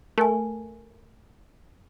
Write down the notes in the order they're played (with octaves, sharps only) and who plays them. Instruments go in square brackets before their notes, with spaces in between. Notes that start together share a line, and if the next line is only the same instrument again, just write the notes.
[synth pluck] A3 [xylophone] A#4 G#5